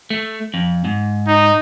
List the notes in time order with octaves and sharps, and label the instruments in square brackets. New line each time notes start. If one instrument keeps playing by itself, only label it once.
[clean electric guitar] A3
F2
G#2
[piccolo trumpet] D#4